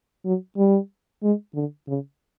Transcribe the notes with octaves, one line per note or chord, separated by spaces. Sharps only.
F#3
G3
G#3
D3
C#3